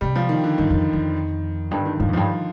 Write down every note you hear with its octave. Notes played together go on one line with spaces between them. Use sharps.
C3 G3
F3
D#3
D3
G2 D#3
F2
F2
G2 D3
D#3
G2 F3
F2
G2 F3